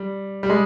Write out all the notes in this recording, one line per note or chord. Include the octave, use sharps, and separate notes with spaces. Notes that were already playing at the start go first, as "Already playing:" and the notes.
Already playing: G3
G3
G#3